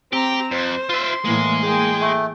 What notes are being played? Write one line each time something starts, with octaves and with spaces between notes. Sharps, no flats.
C4 G4 A#5
F2 C5
F4 E5 C6
A2 E3 G#3 A#3
A#3 G#4 G5
A3